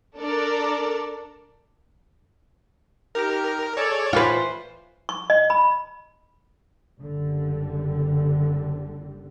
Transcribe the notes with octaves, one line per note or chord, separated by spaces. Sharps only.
D4 A4 A#4 D5
D#4 G4 A#4
G#4 A4 C#5 D5
E3 F4 B4 C5
C#6
D#5
B5
F#1 D3 G3